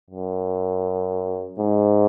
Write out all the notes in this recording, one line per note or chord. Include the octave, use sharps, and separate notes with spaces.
F#2
G#2